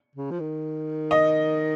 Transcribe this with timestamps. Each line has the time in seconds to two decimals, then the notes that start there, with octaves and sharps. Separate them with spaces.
0.15 C#3
0.31 F3
0.39 D#3
1.11 D#5